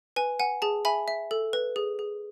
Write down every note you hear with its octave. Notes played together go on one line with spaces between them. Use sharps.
B4 G#5
F#5 G#5
G#4 A5
E5 G#5 B5
E5
A4
B4
G#4
G#4